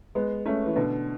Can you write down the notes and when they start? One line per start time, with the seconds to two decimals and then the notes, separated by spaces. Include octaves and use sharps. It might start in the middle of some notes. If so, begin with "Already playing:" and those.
0.15 G#3 B3
0.46 A3 C#4
0.66 E3
0.76 B2 D3